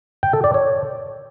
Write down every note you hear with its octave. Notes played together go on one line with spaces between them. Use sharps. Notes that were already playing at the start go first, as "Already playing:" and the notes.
G5
A4
D5
C#5